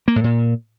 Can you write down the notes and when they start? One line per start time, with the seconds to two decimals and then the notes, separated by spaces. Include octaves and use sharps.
0.08 A#3
0.16 A2
0.24 A#2